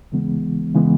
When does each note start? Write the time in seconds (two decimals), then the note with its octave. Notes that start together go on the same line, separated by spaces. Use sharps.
0.12 D#2 C#3 E3 G#3 B3
0.74 C#3 E3 G#3 B3